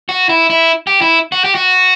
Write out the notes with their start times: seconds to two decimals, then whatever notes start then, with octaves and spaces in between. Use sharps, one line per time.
0.09 F#4
0.29 E4
0.50 E4
0.87 G4
1.02 E4
1.32 F#4
1.44 G4
1.55 F#4